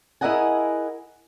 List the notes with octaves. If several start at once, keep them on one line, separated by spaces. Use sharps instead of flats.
E4 G#4 A#4 D#5 F#5 G#5